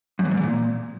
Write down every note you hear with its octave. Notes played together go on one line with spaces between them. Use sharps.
F#2
E2
G#2
E2
A#2